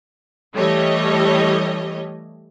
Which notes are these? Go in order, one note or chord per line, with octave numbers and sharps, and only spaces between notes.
E3 G3 A3 C#5 D#5